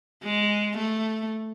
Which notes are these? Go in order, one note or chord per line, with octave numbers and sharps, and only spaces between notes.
G#3
A3